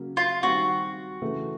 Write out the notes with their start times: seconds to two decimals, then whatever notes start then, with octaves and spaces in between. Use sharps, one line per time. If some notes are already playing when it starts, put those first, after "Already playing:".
Already playing: C#3 F#3 A#3
0.17 F4
0.43 D#3 G3 C4 F#4
1.22 C#3 E3 A3